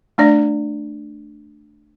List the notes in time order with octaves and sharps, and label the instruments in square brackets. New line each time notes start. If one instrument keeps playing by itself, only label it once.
[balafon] A3 D4 D5